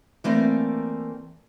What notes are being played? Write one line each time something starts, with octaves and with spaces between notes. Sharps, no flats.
E3 A3 A#3 C4 D5